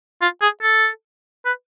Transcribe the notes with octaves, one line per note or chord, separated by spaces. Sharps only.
F4
G#4
A4
B4